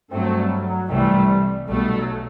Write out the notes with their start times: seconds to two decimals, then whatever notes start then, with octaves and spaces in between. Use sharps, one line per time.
0.11 G2 F#3 A3 C4
0.37 G3
0.64 F#3
0.89 C2 C3 E3 G3 A3
1.67 B1 B2 G3 A3
1.94 F#3